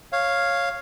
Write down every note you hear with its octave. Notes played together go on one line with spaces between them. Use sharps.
C#5 F5